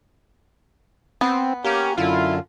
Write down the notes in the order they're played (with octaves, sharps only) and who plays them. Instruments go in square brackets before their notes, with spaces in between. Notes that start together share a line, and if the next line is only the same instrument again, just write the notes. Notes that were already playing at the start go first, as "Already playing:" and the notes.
[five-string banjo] B3 [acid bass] C4
[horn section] A#3 C#4 [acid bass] G4
[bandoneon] F#2 D3 [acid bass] E4 [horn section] F4